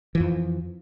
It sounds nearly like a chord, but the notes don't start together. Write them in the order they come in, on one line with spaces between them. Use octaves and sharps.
E3 F3 F2